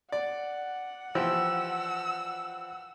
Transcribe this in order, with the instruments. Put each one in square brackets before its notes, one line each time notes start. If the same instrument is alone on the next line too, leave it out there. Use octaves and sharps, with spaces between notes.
[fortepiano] D5 [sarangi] F#5
[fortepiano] E3 F3 G4 [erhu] E6